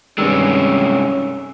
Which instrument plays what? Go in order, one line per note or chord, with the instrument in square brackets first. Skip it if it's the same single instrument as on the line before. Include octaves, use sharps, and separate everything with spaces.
[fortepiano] G2 D#3 [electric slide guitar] C3 G#3 [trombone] C#4 [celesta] E6